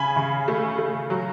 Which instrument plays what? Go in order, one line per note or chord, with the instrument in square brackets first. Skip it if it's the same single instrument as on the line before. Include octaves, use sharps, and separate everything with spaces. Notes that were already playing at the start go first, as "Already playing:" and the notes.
Already playing: [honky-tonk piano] C#3 G#5 B5
C#3
A3
A3
F#3